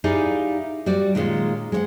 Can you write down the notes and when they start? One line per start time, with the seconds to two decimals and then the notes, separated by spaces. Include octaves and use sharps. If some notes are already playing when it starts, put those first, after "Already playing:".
0.04 D#4 E4 G4 G#4 D5 F5
0.86 G3 F#4 D5
1.15 A#2 D#3 G#3 B3 C#4 F4
1.72 G#3 C#5 F#5